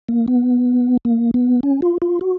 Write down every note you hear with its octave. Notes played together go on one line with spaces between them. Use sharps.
A#3
B3
A#3
B3
C#4
F4
F4
F#4